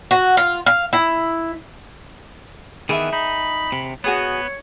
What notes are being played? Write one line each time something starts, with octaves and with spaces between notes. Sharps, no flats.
F#4
F4
F5
E4
D#3 E3 B3 G#4 E5
D#4 B5
C3
B3 F#4 G#4 C#5 D#6